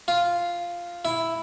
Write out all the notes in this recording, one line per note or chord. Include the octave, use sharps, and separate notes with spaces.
F4
E4